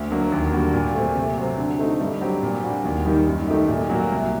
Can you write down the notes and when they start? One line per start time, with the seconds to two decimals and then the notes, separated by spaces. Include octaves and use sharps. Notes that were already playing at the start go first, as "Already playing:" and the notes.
Already playing: D2
0.10 D3 F#3 A#3
0.32 D#2
0.52 D3 G3 A#3 F#4
0.74 A#2
0.94 A3 C4
1.15 C3
1.37 F#3 C4
1.57 D3
1.79 A3 C4 D#4
2.00 G2
2.21 F#3 C4 G4
2.42 A#2
2.63 G3 D4 F#4
2.85 D#2
3.06 D#3 G3 A#3 D#4
3.27 F#2
3.47 D#3 A3 D#4 G4
3.69 A#2
3.90 F#3 A#3 F#4
4.12 C2